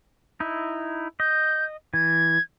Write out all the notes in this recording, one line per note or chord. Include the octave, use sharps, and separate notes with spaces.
D#4 E4
D#5 G6
E3 G#6